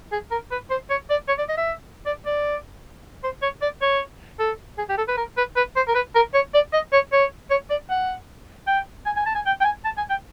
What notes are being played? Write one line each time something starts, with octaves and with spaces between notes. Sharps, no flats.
G#4
A#4
B4
C5
C#5
D5
C#5
D5
D#5
E5
D5
D5
C5
C#5
D5
C#5
A4
G#4
G4
A4
B4
A#4
B4
B4
C5
A#4
B4
A#4
C#5
D5
D#5
C#5
C#5
C#5
D5
F#5
G5
G#5
G#5
A5
G#5
G5
G5
G#5
A5
G#5
G5